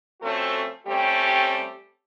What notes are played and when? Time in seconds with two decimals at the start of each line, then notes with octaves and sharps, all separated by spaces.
0.22 F2 A3 C4 C#4 F#4 A4
0.87 G3 A3 C4 C#4 G4